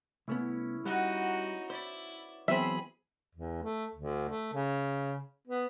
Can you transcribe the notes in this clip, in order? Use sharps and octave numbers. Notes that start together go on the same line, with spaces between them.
C2 A3 B3 C#4 E4
G3 B3 D#4 F#4 B4 F#5
E4 C5 D5
E3 F#3 B3 C4 G#4 E5 B5
E2
A3
D2
A3
C#3
B3